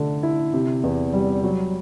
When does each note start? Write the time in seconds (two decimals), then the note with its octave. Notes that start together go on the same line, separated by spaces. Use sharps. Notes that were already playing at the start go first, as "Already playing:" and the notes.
Already playing: D3 A3
0.23 E4
0.53 C3
0.84 E2
1.13 G3
1.43 F#3